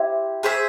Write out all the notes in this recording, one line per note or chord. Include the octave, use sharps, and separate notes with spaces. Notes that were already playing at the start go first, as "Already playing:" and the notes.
Already playing: E4 G4 C5
G#4 C5 E5